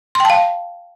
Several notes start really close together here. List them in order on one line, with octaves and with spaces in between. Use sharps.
C6 G5 A5 F5